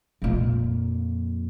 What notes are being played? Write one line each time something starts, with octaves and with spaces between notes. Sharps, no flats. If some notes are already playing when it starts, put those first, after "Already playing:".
F2 A#2